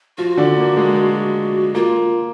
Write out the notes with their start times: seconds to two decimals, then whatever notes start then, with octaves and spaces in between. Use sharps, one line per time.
0.18 F3 F4 F#4
0.37 D3 D4
0.57 A#3
0.77 G#3
0.94 G#3
1.75 A#3 F4